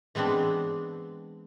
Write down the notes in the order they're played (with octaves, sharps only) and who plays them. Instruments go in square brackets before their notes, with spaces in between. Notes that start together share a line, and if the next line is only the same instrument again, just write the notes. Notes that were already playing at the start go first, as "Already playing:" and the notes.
[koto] E3 G#3 B3 C4 D4